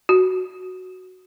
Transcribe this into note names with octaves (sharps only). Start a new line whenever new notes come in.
F#4